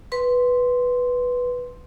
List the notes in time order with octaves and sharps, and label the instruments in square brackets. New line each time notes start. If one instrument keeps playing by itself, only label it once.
[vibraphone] B4 C6